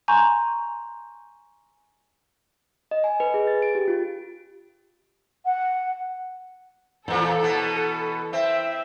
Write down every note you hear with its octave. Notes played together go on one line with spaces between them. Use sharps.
G#5 A#5 C6 C#6 G6
D#5
G#5
B4
G#4
A6
D7
G4
F4
F#5
E2 A#2 E3 A4
B2 B3
C4 E5